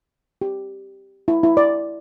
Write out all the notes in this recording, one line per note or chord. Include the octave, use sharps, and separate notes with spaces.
G4
E4
E4
D5